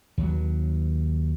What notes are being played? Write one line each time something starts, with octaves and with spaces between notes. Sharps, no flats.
D#2 F#3